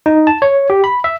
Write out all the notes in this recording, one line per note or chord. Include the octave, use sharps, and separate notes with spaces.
D#4
A5
C#5
G4
B5
E5